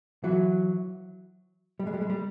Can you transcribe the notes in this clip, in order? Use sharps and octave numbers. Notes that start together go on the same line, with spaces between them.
E3 F#3
G3
G#3
G3
G#3
G3